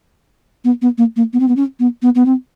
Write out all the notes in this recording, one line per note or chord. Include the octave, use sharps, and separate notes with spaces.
B3
B3
A#3
A#3
B3
C4
B3
C#4
B3
B3
B3
C4